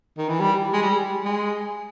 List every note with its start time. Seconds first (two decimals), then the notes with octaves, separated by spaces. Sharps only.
0.18 D#3
0.29 E3
0.40 G3
0.73 G#3
0.82 G3
1.25 G#3